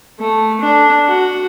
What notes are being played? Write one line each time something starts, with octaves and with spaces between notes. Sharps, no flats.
A3
D4
F#4